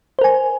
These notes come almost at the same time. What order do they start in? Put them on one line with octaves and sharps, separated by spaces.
C5 A#4 G#5